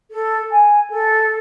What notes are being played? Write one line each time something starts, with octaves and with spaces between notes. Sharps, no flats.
A4
G#5
A4